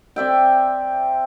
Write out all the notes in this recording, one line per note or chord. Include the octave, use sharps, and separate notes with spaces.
C4 D5 E5 G5